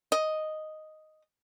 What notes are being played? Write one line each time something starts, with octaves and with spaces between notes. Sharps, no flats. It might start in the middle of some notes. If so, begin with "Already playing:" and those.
D#5